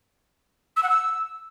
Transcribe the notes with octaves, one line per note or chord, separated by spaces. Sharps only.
E6
F#5
E6